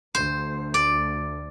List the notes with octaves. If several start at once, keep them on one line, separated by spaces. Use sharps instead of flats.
D2 C5
D5